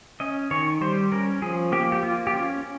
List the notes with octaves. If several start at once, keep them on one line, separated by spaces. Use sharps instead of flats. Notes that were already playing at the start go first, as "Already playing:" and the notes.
C#4 D#5
D#3 C#5
G3 C5
C#4 A#4
F3 G#4
A#3 G4
G4
A#3 F4
G4
C#4 F4